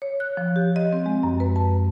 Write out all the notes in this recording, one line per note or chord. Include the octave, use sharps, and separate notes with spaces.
C#5
F#6
F3
G4
D#5
C4
G#3
F#2
B4
A5